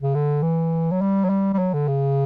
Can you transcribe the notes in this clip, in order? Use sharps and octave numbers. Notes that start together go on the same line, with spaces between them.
C#3
D3
E3
F#3
G3
F#3
G3
G3
F#3
D3
C#3